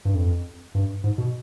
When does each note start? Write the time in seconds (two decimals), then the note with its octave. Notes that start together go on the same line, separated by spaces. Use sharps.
0.05 G2
0.15 F2
0.75 G2
1.04 G#2
1.18 B2